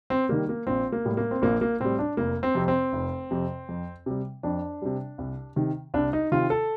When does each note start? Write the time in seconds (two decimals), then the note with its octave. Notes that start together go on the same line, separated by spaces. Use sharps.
0.10 C4
0.29 D#3 G3 A#3
0.49 A#3
0.67 A#1 C4
0.92 A#3
1.05 A2 G3
1.17 A#3
1.31 C4
1.42 A#1 A#3
1.61 A#3
1.80 A2 G3 C4
1.99 D4
2.17 F1 A#3
2.43 C4
2.55 F2 C3
2.68 C4
2.93 F1
3.31 F2 C3
3.69 F2
4.06 C3 G3
4.43 F2 D4
4.82 C3 G3
5.18 C2
5.56 C3 D#3
5.94 C2 D4
6.13 D#4
6.32 C3 D#3 F4
6.50 A4